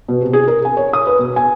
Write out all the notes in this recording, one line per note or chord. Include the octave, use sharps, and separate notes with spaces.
B2
C3
G#4
A#4
G#5
C#5
D#6
B4
B2
G#5